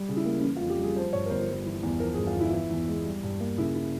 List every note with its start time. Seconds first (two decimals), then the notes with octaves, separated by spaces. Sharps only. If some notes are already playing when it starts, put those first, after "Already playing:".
Already playing: G3
0.09 C#3
0.17 E4
0.26 A#3
0.39 C#4
0.43 E3 E4
0.56 F4
0.61 F2
0.70 G4
0.78 G3
0.83 G#4
0.96 F3 C5
1.13 G2 C#5
1.26 A#4
1.30 G1 C5
1.49 G3
1.65 E3
1.83 E2
2.00 F3 A#4
2.14 G#4
2.17 G2
2.27 F4
2.36 G1 E4
2.53 E3
2.70 E2
2.88 G#3
3.05 G3
3.23 G2
3.40 A#3
3.58 C#3 E4
3.75 E4